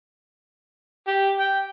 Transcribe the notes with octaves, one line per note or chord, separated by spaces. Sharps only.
G4
G5